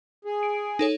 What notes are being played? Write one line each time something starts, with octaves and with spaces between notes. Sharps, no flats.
G#4
D7
D#4 A4 C#5